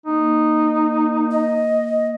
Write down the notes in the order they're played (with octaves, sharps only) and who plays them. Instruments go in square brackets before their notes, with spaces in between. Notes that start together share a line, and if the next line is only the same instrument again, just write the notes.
[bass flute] A#3 [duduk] D#4
[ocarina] D#5